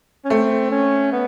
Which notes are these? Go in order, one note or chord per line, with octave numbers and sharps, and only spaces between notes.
C#4
A3 C4
C#4
B3